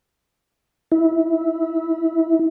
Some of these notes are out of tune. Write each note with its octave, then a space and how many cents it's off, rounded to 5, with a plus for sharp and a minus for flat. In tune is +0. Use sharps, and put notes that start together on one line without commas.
E4 -20